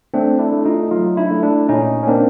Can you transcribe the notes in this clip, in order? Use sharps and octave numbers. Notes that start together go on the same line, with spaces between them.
A3 C4 D4
D4 E4
A3
D#4 F4
F#3 D#4 F4
D4 E4
A3
D4 E4
A#2 C#4 D#4
C#4
A#3 C4 D4